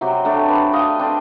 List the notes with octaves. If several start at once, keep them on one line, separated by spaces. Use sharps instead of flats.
C3 F#3 C4 G4
A3 D4
B4
D#5 F5 G5
C4 D4